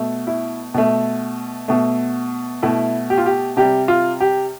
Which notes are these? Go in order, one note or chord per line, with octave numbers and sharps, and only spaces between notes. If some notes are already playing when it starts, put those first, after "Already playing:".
Already playing: B2 A3
E4
B2 A3
B2 A3
B2 A3 E4
G4
F4
G4
C3 G3 G4
F4
G4